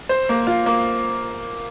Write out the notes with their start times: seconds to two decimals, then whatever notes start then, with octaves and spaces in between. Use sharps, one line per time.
0.09 C5
0.29 A#3
0.47 F4
0.66 A#3